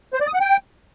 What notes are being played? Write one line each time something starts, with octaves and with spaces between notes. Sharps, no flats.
C5
D5
D#6
F#5
G5